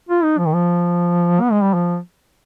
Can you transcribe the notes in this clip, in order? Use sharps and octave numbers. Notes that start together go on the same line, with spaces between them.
F4
D#4
F3
D#3
F3
B3
G#3
G3
F3